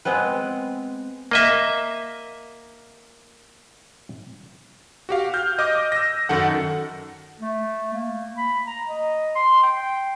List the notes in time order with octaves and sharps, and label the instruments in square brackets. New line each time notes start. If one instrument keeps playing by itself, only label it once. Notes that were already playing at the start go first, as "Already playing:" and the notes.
[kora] G#3 B3 C4 B4
[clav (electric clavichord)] A#3 D#5 E5
[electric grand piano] F#4 G4 F5
F6 G6
D#5 D6
E6 A#6
F#2 D#3 A4 F#5
[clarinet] A3
A#3
B5
A#5
D#5
C6
G5